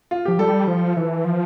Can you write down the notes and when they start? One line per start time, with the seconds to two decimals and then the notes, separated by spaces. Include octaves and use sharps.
0.11 F4
0.25 F3 G4
0.39 G3 A4
0.67 F3
0.97 E3
1.25 F3